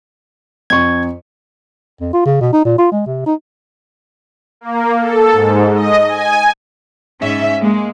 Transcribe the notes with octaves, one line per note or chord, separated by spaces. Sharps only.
F2 C#6 G#6
F2
F4
C#3
B2
D#4
A#2
F4
G#3
C3
D#4
A#3
A4
G#2
D#5
G#5
G#2 C#4 E5
G#3 A#3